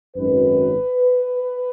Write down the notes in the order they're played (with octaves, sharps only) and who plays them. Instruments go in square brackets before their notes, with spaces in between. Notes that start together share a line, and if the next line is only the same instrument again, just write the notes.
[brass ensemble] G#1 F#2 D#3 F#3 B4